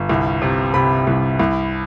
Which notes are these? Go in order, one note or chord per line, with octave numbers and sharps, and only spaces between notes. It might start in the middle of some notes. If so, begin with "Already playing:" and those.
Already playing: G1
C2
C3
C3 B5
C2
C2